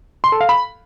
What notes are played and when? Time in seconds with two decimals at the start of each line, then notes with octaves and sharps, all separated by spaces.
0.24 C6
0.32 A4
0.41 F5
0.49 B5